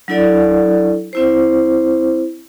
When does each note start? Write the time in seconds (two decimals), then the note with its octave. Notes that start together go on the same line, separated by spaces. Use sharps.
0.08 F#3 D4 E4 A4 D5
1.13 C4 E4 C5